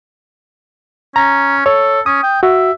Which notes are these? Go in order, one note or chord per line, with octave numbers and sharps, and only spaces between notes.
C#4 A#5
A4 C#5
C#4 D#6
G5
F#4 E5